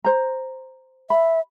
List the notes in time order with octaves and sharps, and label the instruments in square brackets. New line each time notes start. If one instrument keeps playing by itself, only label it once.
[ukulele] C5 A#5
[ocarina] E5 [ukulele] B5